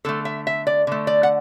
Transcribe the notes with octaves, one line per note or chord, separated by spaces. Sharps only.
D3 A3 A4
E5
E5
D5
D3 A3
D5
F#5